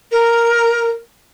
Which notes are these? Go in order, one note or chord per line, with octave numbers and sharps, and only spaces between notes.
A#4